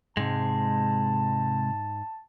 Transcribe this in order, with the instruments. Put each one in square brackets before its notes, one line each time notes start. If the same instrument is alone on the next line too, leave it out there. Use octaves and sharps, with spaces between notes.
[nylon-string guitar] G#2 [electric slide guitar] C3 G#3 [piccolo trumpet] A5